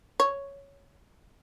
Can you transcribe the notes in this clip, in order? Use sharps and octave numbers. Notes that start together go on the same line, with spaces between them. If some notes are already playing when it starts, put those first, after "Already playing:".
C#5